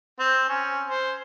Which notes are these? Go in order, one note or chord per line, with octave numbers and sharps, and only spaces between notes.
C4
C#4
C5